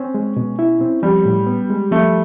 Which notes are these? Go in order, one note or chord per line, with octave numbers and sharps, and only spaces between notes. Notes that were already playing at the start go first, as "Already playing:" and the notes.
Already playing: C4 C#4
G#3
B2
E4
C4
F3 G3
A2
B3
G#3
F3 A3